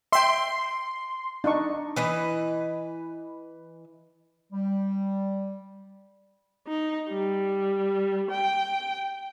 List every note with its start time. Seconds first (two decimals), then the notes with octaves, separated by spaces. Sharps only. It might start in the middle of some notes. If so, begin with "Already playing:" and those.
0.12 E5 G5 C6
1.44 D4 D#4 C#6
1.96 E3 B4 D#5
4.53 G3
6.68 D#4
7.09 G3
8.31 G5